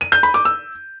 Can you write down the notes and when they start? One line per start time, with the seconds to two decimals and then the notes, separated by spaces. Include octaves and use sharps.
0.01 D#7
0.12 G6
0.23 B5
0.34 D6
0.45 E6